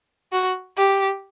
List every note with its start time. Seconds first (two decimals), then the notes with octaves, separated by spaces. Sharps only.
0.33 F#4
0.78 G4